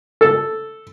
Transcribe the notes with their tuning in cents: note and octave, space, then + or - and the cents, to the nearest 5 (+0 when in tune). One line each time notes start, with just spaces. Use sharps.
A4 +0